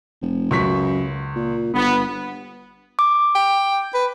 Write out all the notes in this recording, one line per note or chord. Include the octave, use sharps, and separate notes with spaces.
F1
C#2 F#2 C#6 B6
A#2
G1 B3
D6
G5
B4